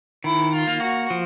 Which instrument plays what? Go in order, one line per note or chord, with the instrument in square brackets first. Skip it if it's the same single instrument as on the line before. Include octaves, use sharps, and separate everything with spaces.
[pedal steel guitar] D#3 [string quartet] E4
[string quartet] F4
[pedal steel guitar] A#3
[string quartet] F#4
[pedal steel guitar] F3